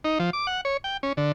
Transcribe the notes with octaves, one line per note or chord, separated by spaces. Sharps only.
D#4
F3
D6
F#5
C#5
G5
C#4
D3